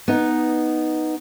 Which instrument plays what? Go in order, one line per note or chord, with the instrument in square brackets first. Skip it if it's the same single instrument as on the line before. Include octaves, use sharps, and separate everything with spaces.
[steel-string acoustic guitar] B3 D#4